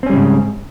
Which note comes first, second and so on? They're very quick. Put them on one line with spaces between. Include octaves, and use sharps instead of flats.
C4 C#4 G3 C#3 G#2